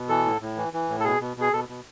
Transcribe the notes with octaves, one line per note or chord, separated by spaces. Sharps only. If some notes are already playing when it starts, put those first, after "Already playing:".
Already playing: B2
E3 A4
A2
A2
E3
E3
A2
A4
B2 G#4
B2
B2 G#4
B2 A4
B2